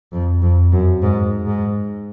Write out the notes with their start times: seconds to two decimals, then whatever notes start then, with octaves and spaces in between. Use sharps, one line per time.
0.13 F2
0.42 F2
0.72 F#2
1.02 G#2
1.46 G#2